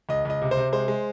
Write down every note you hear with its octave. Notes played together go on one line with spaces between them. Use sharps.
C#2 D#5
C#2 D#5
C3
C5
C3
G#3 C5
G#3